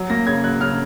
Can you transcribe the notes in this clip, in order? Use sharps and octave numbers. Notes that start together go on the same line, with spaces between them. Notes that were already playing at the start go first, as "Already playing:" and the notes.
Already playing: F#3
A#3 A#6
C#3 G#6
F#3 F#6
C#3 F6